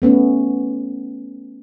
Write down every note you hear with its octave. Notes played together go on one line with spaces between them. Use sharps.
A3 B3 C#4